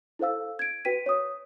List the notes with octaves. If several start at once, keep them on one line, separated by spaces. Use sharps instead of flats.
E4 A4 C5 F5 E6
G#6 D7
F#4 B4 G5 B6 D#7
C#5 D#6